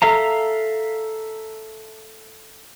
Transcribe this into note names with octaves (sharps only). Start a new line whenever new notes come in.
A4 E5 F5 A#5